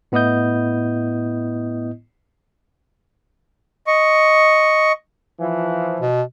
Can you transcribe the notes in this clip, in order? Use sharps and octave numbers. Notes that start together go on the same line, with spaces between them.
A2 B3 E4 D#5 D#6 G6
D#5 C#6
E3 F3
B2